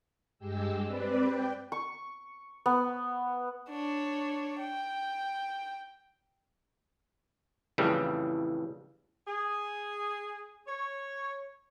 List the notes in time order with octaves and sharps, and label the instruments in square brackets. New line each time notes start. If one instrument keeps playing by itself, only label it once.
[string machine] G2 G#3 G4 E6
C4 B4 D5
G5
[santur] C#6
B3
[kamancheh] D4 C#5
G5
[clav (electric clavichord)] F2 A2 C#3 E3 G3
[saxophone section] G#4
C#5